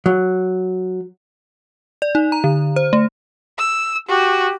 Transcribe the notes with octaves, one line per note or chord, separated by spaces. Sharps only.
F#3
D5
D#4
A#5
D3
C5
A3
E6
F#4 G4